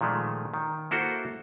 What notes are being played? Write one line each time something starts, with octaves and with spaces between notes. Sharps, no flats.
A#2 D#3 F3 G#3 A3
D#3
A#3 E4 F#4 A4 C5